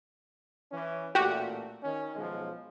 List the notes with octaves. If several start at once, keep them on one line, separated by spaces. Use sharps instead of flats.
E3 C#4
A1 A#2 A3 F#4 G4
D#3 C#4
B1 F3 G#3